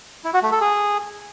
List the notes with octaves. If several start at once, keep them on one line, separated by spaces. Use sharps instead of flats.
E4
F#4
A3
A4
G#4